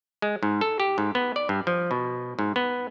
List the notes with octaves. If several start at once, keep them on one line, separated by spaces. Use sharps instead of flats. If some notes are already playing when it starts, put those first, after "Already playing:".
G#3
G#2
A4
G4
G#2
B3
D5
G2
F3
B2
G#2
B3